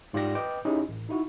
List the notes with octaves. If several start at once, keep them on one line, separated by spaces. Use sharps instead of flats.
G#2 F4 G4 D5 G5 A#6
B4 D#5 G5 D6
C#4 D#4 E4 G4 G#4 D#5
A1
D#4 E4 F#4